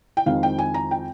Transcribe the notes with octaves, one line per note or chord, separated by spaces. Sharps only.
G5
F2 D#3 G#3 C4 F5
G5
G#5
A#5
G5